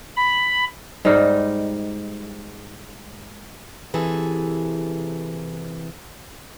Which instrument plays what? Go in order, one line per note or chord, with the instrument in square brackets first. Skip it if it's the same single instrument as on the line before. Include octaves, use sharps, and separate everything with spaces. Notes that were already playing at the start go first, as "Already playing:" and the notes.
[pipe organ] B5
[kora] G#2 G3 D#4 F5
[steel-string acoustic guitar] C3 E3 G#4 A4